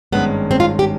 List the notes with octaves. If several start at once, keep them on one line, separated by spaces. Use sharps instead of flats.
G#1 G2 D#3 G#3 B3 C#4
C4
F4
G4